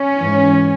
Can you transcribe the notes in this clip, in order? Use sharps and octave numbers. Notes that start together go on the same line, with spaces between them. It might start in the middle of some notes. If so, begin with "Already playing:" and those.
Already playing: C#4
G#2 E3